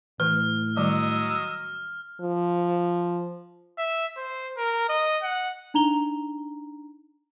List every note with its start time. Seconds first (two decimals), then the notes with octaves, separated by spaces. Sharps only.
0.20 A2 E3 B4 F6
0.77 D#3 F#3 G3 D5 D#5 E6
2.21 F3
3.78 E5
4.17 C5
4.57 A#4
4.89 D#5
5.23 F#5
5.74 D4 D#4 A#5 F7 G7